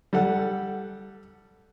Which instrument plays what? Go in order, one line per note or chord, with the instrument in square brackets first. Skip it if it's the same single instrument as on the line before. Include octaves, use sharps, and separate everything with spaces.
[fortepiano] G3 A4 F#5